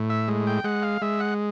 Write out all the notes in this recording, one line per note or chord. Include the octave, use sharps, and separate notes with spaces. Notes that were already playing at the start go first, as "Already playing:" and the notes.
Already playing: A2
E5
G#3
G5
G#3 F#5
F5
G#3 E5
F#5